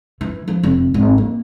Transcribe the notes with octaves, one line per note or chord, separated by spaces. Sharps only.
E3
F3
F1
G#1
A#3